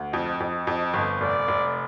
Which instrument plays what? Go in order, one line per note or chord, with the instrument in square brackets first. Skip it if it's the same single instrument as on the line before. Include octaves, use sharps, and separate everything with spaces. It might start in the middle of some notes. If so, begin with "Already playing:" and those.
Already playing: [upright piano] D2
[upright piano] F2 [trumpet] D#5
[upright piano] F2
F2
G1
[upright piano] F1 [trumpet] D5
[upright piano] F1